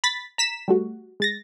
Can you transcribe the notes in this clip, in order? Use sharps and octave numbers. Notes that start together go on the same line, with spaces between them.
B5 A6 B6
A#5 B6 E7
G3 A3 F#4
G#3 A6 A#6